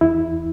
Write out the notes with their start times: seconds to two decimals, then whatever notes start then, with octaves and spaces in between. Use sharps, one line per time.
0.01 E2 E4